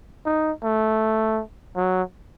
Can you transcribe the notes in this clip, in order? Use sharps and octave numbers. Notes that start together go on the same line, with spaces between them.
D#4
A3
F#3